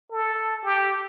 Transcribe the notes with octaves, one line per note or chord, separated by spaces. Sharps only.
A4
G4